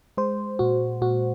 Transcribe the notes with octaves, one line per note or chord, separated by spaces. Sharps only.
G#3 C5
A#2 F#4
A#2 F#4